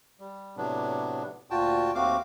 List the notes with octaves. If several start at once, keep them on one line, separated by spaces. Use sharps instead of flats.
G3
A2 C3 F#3 B3 D4
D2 A#2 F4 F#4 G5 A5
D#2 A3 C4 F#4 F5 D6